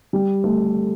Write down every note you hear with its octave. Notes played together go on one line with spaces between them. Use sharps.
G3
A3